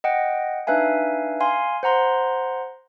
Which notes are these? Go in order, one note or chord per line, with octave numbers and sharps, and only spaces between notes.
D#5 F#5 G5
D4 D#4 B4 E5 F5 G#5
F5 G#5 C6
C5 F#5 A#5 C6